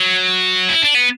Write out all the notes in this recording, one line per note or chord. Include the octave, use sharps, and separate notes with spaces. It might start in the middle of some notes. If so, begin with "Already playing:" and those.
Already playing: F#3
E4
D4
B3